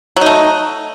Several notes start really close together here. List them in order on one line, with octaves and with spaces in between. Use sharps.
F#3 D#4 A3